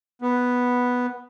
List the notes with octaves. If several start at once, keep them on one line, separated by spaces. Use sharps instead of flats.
B3